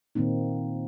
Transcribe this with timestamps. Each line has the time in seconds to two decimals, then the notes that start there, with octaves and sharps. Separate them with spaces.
0.15 A#2 D#3 A#3 C4 D#4